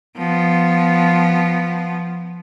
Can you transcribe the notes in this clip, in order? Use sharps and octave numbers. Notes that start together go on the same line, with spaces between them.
F3 B3